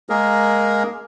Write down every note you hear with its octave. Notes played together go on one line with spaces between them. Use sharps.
G#3 A#3 G#4 A#4